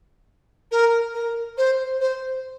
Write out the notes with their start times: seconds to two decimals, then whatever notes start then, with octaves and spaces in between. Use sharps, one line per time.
0.71 A#4
1.13 A#4
1.57 C5
2.00 C5